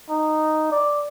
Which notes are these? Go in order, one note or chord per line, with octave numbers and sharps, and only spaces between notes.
D#4
D5